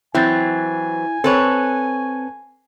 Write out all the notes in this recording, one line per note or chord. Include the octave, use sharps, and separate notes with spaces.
E3 F#3 C4 E4 G#5 A6
C4 A4 B4 C#5